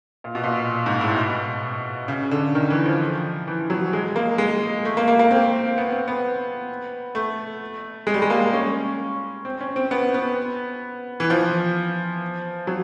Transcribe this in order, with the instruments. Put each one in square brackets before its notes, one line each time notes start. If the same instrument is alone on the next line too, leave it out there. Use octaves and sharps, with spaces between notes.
[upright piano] A#2
B2
A#2
G#2
A2
B2
C#3
D3
D#3
E3
F3
E3
F#3
G#3
A#3
G#3
A3
A#3
A#3
A#3
C4
B3
C4
B3
A3
G#3
G3
G#3
A#3
C#4
C4
C#4
C4
B3
B3
E3
F3
F#3